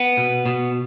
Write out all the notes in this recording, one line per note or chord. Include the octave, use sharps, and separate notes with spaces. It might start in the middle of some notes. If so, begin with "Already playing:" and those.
Already playing: B3
B2
B2